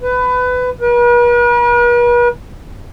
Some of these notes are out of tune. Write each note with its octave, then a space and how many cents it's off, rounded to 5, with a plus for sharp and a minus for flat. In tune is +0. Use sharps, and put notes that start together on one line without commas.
B4 +20
B4 -45